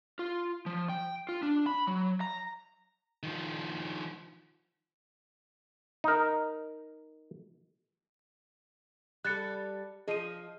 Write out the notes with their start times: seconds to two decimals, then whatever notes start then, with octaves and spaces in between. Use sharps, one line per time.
0.19 F4
0.66 F3
0.89 G5
1.29 F4
1.43 D4
1.66 B5
1.87 F#3
2.21 A#5
3.23 D#3 F3
6.04 D#4 A#4
9.25 G3 A4 F#6 A6 C#7
10.08 F3 G#4 D#5 D#7